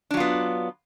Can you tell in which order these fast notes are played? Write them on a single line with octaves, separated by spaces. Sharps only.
D4 F#3 F4 B3